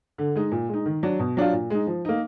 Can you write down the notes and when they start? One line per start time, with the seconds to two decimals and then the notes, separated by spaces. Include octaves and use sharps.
0.18 D3
0.35 G#3 D#4
0.52 A#2
0.69 G#3 D#4
0.86 D#3
1.03 F#3 D4
1.19 B2
1.37 F#3 D4 F4
1.53 A#2
1.70 G#3 D#4
1.87 F3
2.05 A#3 D#4